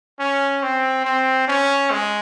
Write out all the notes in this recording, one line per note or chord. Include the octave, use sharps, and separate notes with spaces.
C#4
C4
C4
C#4
G#3